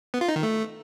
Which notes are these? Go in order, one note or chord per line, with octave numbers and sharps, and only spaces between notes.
B3
F4
D#4
D#3
A3